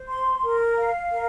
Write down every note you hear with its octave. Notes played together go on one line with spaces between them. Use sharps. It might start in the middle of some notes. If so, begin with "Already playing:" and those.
Already playing: C5
C6
A#4
F5
A#4